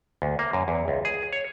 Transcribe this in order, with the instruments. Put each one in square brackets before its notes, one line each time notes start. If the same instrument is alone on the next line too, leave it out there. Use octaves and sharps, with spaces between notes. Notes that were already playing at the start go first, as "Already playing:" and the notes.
[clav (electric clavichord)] D2
A#3
F#2
E2
C#2
G#4
C#5